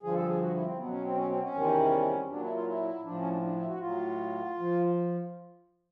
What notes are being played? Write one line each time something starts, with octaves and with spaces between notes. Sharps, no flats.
G2 D3 F3 G#4
A4
G#4
F#4
E4
C4
B2 F#3 B3
C#4
C4
C#4
C4
C#4
E2 C3 D#3 G3
A#2 F#3 D4
E4
F4
E4
A2 F3 D4
C#4
D4
D4
E4
F#4
A2 F#3 F4
F3